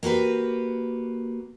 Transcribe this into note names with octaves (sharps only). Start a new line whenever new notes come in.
A#3 F#4 G4 B4